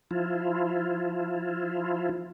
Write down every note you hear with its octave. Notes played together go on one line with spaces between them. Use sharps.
F3 E4 F4